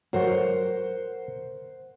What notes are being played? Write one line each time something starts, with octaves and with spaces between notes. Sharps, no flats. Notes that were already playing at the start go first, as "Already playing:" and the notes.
F#3 F#4 A#4 C5 F#5